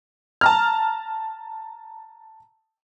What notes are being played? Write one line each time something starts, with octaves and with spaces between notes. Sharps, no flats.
A5 A#5 F6